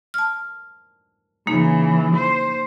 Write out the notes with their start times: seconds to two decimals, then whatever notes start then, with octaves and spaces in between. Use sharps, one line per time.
0.14 A5 F6
1.47 C#3 E3 A#3 D#4
2.16 C5